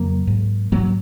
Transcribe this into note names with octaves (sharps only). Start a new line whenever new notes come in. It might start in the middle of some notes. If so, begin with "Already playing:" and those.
Already playing: F2 C#3 F#3 A#3
G#2
G#2 F#3 A#3